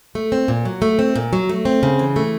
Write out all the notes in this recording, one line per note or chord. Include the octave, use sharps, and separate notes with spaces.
A3
C4
A#2
F#3
A3
C4
A#2
F#3
A3
C4
C#3
E3
A3